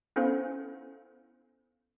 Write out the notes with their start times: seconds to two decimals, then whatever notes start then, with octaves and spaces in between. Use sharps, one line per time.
0.16 B3 C#4 E4 A4 C5 F5